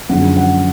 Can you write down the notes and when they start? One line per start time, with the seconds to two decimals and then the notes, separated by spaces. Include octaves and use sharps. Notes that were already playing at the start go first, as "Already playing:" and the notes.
0.09 F#2 D3 F3 G#3 F#5
0.37 F#5